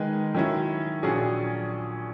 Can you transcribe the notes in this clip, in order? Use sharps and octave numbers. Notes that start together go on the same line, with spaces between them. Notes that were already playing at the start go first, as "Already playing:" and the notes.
Already playing: D#3 G#3 D#4 G#4 B4
D#3 F#3 C#4 E4
A#1 A#2 F#3 C#4 G#4